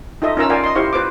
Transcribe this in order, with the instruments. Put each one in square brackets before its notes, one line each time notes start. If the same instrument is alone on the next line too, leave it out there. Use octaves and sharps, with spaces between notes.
[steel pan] D#4 F4 A4 D#5 E5
C#4 D#4 F4 A#4 A#5 E6
F4 A#4 D5 F5 G5 G#5
D#5 C6
E4 G4 C5 F5 C#6
F4 B4 C5 F5 D6